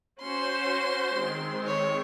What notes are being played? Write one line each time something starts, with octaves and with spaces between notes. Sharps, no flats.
C#4 F#4 C5 C6
D#3 G#3 C4
C#5